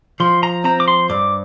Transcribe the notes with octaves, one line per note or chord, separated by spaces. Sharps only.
F3 C6
A#5
C4 A#5
D6
C6
G2 D6